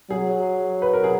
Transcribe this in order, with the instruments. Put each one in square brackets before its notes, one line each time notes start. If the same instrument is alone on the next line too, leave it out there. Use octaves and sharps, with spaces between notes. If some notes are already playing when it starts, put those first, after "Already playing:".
[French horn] F#3 [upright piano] G#4
[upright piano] B4
A#4
G#4